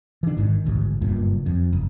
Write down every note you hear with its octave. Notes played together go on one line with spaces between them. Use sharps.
E3 D4
G#1 G#2 D3 D#3
A1 D2 G#2
F#1 G2 A#2
F2
F#1